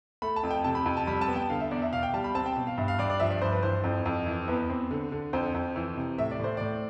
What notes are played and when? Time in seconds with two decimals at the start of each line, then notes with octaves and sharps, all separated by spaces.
0.22 A3 B5
0.36 A5
0.43 F2
0.51 G5
0.64 C3 A5
0.75 B5
0.86 F2
0.97 A5
1.07 G3 B5
1.21 A5
1.28 B3
1.36 G5
1.50 D3 F5
1.60 E5
1.71 E2 D5
1.82 E5
1.92 B2 F5
2.03 G5
2.13 G3 A5
2.24 B5
2.35 C4 A5
2.46 G5
2.56 B2
2.67 F5
2.78 G2 E5
2.88 F5
2.99 G2 D5
3.10 D5
3.20 F3 E5
3.31 D5
3.41 G2 C5
3.52 B4
3.63 E3 C5
3.84 F2
4.06 F2
4.27 E3
4.48 E2 B4
4.70 C4
4.91 D3
5.12 D3
5.33 F2 C5
5.55 F2
5.76 E3
5.97 C3
6.18 A2 E5
6.31 D5
6.39 A2 C5
6.57 A2 D5